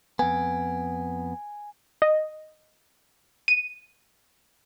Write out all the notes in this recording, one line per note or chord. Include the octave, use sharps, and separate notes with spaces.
F2 B3 G#5
D#5
D#7